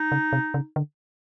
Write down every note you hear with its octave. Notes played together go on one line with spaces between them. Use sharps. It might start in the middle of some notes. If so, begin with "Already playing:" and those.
Already playing: D#4
C#3
C3
C#3
D3